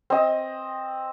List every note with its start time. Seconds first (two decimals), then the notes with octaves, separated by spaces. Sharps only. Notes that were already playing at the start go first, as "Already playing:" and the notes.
0.10 C4 D#5